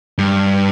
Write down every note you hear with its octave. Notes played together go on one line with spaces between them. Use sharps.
G2